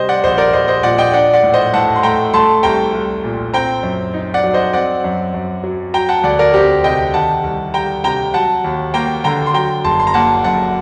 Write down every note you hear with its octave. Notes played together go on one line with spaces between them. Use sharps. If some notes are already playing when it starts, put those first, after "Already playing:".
Already playing: C3 G3 C5 D#5
D5 F#5
A#1 C5 D#5
A#4 D5
A#1 C5 D#5
C5 D#5
A#2 D5 F#5
D#5 G5
D4 D5 F#5
D5 F#5
A2
C5 D#5
A2 F#5 A5
C6
A3 G5 A#5
A3 A5 C6
C2 G5 A#5
C2
A#2
C4 G5 A#5
F#2
D#4
D5 F#5
F#3
C5 D#5
C4 D5 F#5
F#2
F#2
F#3
F#3 G5 A#5
F#5 A5
D2 D5 F#5
A#4 D5
C4 G4 A#4
C3 D#5 G5
D#3 F#5 A5
C2
G3 G5 A#5
C3 G5 A#5
F#3 F#5 A5
D#2
A#3 G5 A#5
D3 G5 A#5
C6
F#3 G5 A#5
F#1 A5 C6
C6
A#5
A#3 F#5 A5
F#2 F#5 A5